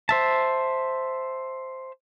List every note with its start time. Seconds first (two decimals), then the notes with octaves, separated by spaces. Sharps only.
0.09 C5 E5 A5